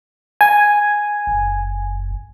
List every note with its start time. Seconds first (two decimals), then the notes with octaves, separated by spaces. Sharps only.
0.41 G#5
1.27 F#1